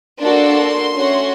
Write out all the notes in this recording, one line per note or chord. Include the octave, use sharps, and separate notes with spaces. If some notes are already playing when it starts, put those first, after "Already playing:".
A#3 D4 F#4 A4 C6
A3 C#4 F#4